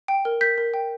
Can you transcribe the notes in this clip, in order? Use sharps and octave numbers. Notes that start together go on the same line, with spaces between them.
G5
A#4
A#4 G6 B6
A#4
G5